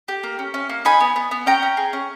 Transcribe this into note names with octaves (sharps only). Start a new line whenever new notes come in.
G4
A#3
C#4
C#4
A#3
D#4 G#5 B5
B3
B3
B3
C#4 G5 A#5
C#4
G#4
C#4